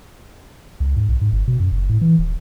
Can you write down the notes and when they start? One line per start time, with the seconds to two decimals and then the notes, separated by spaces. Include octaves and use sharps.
0.80 C#2
0.96 G#2
1.09 B1
1.21 G#2
1.32 G1
1.48 B2
1.60 F#2
1.72 F#1
1.89 A2
2.01 E3
2.19 D#1